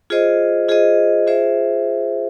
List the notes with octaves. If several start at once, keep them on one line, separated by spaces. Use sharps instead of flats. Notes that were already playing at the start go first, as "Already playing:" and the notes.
F4 G#4 C5 D#5
F4 G#4 C5 D#5
F4 G#4 C5 E5